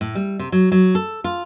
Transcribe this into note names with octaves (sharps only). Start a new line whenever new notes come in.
A2
G3
C3
F#3
F#3
A4
F4